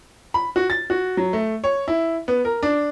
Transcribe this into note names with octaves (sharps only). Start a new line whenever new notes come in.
B5
F#4
A6
F#4
F#3
A3
C#5
E4
B3
A#4
D4